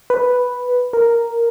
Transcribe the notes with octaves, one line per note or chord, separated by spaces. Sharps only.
B4
A#4